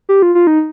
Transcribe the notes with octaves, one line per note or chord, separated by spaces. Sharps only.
G4
F4
F4
D#4